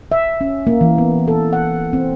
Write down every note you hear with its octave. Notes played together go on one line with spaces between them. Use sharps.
E5
C#4
A#3
E3
B3
A4
F#5
C4